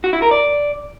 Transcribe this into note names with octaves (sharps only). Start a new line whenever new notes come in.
F#4
E4
A#4
D5